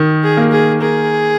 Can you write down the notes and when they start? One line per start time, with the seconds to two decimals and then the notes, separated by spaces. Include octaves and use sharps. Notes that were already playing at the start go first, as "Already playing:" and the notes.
Already playing: D#3
0.23 G#4
0.37 A#3
0.52 G#4
0.81 G#4 A#4